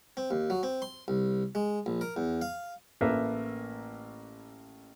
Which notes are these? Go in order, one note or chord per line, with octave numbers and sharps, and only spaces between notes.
C4
D#2
F#3
C4
C6
C2
G#3
A#1
A#4
E2
F5
A1 A3 A#3 B4 E5